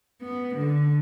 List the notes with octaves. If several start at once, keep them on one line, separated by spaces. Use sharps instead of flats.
B3
D3